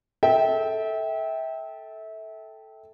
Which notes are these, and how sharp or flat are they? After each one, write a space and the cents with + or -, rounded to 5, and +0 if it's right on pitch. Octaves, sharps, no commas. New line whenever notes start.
A4 +0 E5 -25 G5 +0